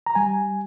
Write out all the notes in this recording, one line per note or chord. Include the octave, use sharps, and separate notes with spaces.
A#5
G3 G#5